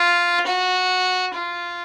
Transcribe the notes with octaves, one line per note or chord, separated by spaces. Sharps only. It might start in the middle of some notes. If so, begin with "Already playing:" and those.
Already playing: F4
F#4
F4